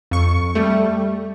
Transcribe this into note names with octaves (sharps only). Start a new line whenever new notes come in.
F2 C#6
G3 A3